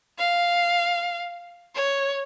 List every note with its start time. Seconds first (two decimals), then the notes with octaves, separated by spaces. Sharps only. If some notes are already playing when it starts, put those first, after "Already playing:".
0.18 F5
1.75 C#5